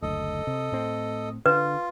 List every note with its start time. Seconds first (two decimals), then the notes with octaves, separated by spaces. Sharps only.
0.02 F#1 D2 A4 D#5
0.47 C3
0.72 A2 C4
1.46 D3 F4 B4